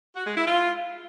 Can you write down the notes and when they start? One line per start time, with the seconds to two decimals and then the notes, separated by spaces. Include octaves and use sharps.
0.15 F#4
0.26 G#3
0.36 E4
0.46 F4